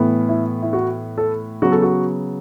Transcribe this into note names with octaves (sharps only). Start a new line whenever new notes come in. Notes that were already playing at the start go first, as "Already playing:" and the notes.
Already playing: A2 E3 B3
E4
E4
F#4
A4
C#3 F#3 B3 F#4
A4
F#4